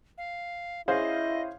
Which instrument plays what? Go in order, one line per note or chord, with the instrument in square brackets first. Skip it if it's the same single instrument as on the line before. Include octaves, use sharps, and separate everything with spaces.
[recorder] F5
[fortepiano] C#4 G#4 C5 [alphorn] E4 [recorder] D#5 [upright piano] F5